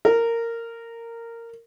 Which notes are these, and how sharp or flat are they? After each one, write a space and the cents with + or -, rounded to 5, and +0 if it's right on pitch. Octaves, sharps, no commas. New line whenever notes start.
A#4 -15